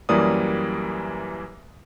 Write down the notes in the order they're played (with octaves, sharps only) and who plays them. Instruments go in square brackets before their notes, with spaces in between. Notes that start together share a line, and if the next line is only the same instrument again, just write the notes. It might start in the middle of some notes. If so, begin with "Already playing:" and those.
[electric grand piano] F#2 E3 G3 A#3 D5 D#6